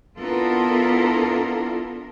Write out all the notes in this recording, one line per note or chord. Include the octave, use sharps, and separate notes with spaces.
B3 D4 E4 F4 A4 A#4